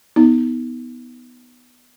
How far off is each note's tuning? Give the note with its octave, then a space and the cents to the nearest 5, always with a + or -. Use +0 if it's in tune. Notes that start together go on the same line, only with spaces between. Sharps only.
B3 +0 D#4 +25